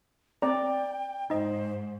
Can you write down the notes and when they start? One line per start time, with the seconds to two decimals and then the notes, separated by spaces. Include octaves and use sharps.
0.42 C4 D5 G5 A#5
1.30 G#2 D#4 C5 D#5